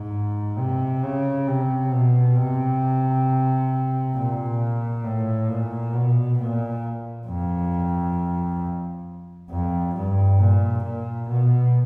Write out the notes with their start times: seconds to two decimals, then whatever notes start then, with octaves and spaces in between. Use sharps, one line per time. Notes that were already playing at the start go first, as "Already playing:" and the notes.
Already playing: G#2
0.58 C3
1.03 C#3
1.48 C3
1.92 B2
2.36 C3
4.15 A#2
5.04 A2
5.49 A#2
5.93 B2
6.37 A#2
7.27 F2
9.50 F2
9.95 G2
10.39 A#2
10.84 A#2
11.28 B2